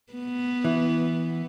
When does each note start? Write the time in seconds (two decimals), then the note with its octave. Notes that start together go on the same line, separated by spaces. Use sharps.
0.13 B3
0.64 E3